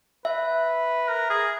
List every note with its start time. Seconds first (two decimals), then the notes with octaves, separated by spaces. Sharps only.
0.25 B4 E5
1.09 A#4
1.30 G#4